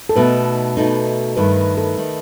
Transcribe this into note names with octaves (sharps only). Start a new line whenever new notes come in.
A4
B2 A3 D#4 B4
B2 A3 D#4
G2 D#3 A3 B4
B4
A4
D#3 A3